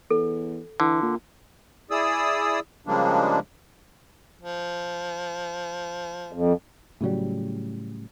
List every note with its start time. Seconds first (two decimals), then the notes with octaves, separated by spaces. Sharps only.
0.10 E2 A4
0.80 D3 E3
1.02 A#2
1.91 E4 G#4 D5 D#6 E6
2.87 C#3 F3 G3 G#3 A#3 D4
4.41 F3
6.33 F2
7.01 A2 C#3 F#3 G3